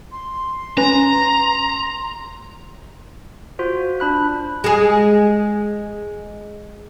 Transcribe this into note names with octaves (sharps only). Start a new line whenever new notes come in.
C6
C#4 B4 G#5 A#5
F4 F#4 C5
D4 B5 F#6
G#3 G#4